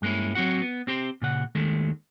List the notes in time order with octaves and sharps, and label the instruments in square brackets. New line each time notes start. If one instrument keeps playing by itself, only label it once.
[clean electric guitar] G2 G#3 A#3 C#4 E4
F#3 C4 F#4 F#5
B3
C4 G4 C5
A#2 C#3 F#5
D#2 D#3 G#3 A3